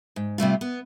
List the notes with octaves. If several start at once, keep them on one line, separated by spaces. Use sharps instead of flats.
G#2
C3 G3 A3 F4
B3